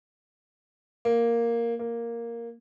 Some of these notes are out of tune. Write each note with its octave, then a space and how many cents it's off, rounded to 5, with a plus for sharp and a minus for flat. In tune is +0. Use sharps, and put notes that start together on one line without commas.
A#3 +0
A#3 +0